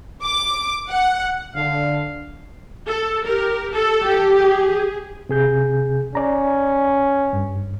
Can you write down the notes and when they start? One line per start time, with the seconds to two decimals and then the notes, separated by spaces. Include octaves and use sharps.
0.23 D6
0.88 F#5
1.55 D3 F5
2.87 A4
3.25 G4 A#4
3.72 A4
4.04 G4
4.37 G#4
5.29 C3 G#4 G6
6.15 C#4 D5 A#5
7.33 G2